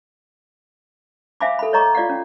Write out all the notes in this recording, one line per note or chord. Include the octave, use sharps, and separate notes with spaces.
C5 E5 F5 G#5 B5 D6
A4 B5
C#5 D#5 A#5 C#6 D6
F4 D5 F5 F#5
C#4